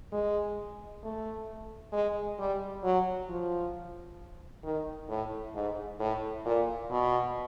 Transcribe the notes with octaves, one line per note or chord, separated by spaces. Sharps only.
G#3
A3
G#3
G3
F#3
F3
D#3
A2
G#2
A2
A#2
B2